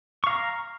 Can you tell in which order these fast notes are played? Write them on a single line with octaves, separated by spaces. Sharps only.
C#6 F5 A#5